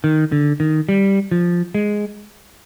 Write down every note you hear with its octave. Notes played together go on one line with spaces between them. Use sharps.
D#3
D3
D#3
G3
F3
G#3